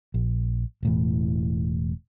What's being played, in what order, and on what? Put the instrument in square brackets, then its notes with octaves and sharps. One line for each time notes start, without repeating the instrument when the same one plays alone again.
[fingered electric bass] A#1
E1 A2 E3